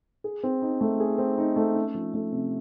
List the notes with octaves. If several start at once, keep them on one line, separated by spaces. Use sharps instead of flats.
G#4
C4
D#4
A3
G#4
C4
D#4
A3
C#4
F3
A3
C3